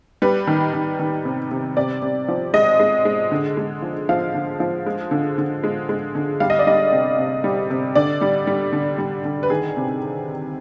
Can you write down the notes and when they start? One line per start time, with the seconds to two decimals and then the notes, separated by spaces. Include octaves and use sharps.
0.22 G3 B4
0.47 D#3
0.74 D#3
0.99 D#3
1.25 C3
1.51 C3
1.77 C3 D5
2.02 C3
2.28 F3
2.54 G#3 D#5
2.80 G#3
3.05 G#3
3.32 D3
3.57 G#3
3.82 F3
4.09 F3 F5
4.34 D3
4.60 F3
4.86 G#3
5.11 D3
5.38 D3
5.63 G#3
5.89 G#3
6.15 D3
6.40 G3 F5
6.50 D#5
6.59 D5
6.67 G3 D#5
6.92 C3
7.18 C3
7.44 G3
7.70 C3
7.95 D3 D5
8.21 G3
8.47 G3
8.73 D3
8.98 G3
9.25 D3
9.43 B4
9.50 D#3 G#4
9.76 C3